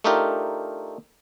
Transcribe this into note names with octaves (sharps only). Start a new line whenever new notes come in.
A3 D4 D#4 F4 G4 A#4